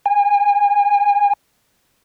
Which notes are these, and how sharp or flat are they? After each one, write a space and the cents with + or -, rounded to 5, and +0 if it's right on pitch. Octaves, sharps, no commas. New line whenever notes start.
G#5 -30